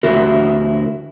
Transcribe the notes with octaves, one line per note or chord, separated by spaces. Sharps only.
D2 E4 F#4 A#4